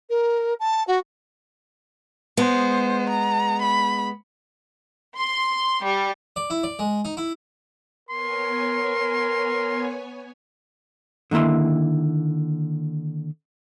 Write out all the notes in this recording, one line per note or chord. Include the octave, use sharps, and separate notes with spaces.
A#4
A5
F#4
G#3 B3 C5
A#5
B5
C6
G3
D5
E4
D5
G#3
D#4
E4
B3 A#4 C#5 G#5 C6
D3 D#3 A#3 E4 C6